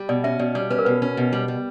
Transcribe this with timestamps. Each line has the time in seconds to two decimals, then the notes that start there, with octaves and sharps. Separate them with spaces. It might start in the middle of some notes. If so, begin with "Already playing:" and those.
Already playing: G3
0.09 B2 D5
0.24 C#4 E5
0.39 B2 D5
0.55 G3 D5
0.70 C#4 B4
0.78 A#4
0.85 B2 B4
1.02 C#4
1.17 B2
1.33 G3
1.48 G3